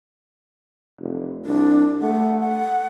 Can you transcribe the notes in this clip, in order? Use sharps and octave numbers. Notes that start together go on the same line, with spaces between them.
F1
C2 D4
A3 F#5
F#5